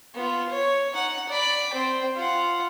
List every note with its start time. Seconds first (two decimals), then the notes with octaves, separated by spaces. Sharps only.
0.15 B3 F4
0.50 C#5
0.93 D#4 F#5
1.29 D5 B5
1.73 C4 G5
2.16 F4 F#5